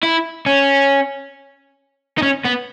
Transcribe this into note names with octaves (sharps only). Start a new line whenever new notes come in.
E4
C#4
D#4
C#4
B3